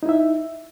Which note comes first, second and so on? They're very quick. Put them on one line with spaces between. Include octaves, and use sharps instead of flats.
D#4 E4 E5